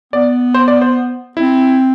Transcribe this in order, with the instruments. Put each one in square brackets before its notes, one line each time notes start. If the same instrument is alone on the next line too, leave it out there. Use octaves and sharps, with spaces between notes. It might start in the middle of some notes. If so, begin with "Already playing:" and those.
[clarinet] B3 [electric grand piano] D5
[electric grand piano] C5
D5
C5
[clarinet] C4 [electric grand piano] E4